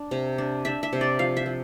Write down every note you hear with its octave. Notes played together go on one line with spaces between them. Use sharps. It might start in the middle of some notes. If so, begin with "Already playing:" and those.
Already playing: D4
C3
D4
D4 E5
E5
C3
D5
F3 F5
E5
F3